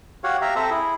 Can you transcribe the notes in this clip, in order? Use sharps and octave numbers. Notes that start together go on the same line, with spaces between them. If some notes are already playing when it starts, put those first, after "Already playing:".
F#4 G4 C#5 F5 F#5
G4 E5 F5 A#5
C4 A4 C5 E5 A#5
E4 G#4